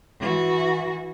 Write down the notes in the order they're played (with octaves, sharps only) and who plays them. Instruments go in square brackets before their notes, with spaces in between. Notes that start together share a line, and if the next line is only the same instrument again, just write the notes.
[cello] E3 F#4